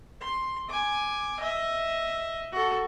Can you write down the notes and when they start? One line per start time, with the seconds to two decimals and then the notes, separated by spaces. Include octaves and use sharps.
0.21 C6
0.69 G#5 D6
1.40 D#5 E5
2.52 F#4 A4